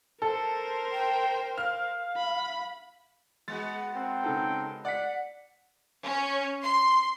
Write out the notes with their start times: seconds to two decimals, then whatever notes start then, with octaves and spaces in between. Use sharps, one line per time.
0.22 A4 A#4 C5
0.92 G5
1.58 F5 F6
2.16 B5
3.48 G#3 B3 F#4 A6
3.95 C4 A#4 G5
4.23 C#3 D#4 A4
4.85 D5 F#5 B6
6.04 C#4
6.64 C6